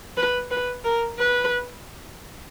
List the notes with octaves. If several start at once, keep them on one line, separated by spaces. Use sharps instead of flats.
B4
B4
A#4
B4